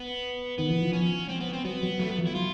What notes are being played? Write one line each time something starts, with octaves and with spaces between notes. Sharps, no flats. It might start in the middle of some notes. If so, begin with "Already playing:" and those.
Already playing: B3
D#3 B3
E3
F3
C#4
C4
B3
C4
F#3 B3
F#3
F#3 A3
B3
F3
E4
F#3 F4